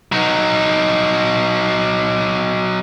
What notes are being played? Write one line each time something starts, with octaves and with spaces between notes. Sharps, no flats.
F#3 D#4